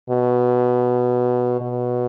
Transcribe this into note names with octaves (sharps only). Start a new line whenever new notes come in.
B2
B2